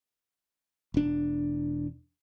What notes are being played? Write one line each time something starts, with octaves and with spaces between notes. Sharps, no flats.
E1 D4